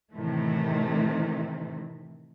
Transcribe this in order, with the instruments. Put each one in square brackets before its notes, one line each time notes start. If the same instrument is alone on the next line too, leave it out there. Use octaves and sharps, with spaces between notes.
[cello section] A2 C3 D#3 E3 A3